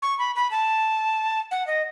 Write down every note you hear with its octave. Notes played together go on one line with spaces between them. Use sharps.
C#6
B5
B5
A5
F#5
D#5